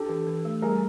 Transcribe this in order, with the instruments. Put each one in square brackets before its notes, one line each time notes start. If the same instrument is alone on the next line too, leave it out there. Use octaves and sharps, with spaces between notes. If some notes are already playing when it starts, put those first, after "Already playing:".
Already playing: [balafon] D4 [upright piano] G4 A4
[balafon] E3
E3
A3
[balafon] G3 [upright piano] G#4 A#4